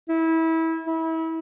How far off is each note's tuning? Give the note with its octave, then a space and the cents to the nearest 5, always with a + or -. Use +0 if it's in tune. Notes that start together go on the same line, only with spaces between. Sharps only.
E4 -25
E4 -30